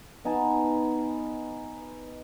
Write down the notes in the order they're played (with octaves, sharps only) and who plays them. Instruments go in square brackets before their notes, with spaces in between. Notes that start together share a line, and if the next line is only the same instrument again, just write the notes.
[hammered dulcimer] B3 D#4 G#5 A5